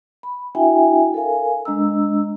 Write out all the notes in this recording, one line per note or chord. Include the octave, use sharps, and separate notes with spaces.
B5
D4 E4 F#4 E5 G5 G#5
A4 A#4 F5 G#5
G#3 D4 D#5 A#5 E6